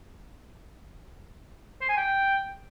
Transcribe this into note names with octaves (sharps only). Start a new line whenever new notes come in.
C5
G#5
G5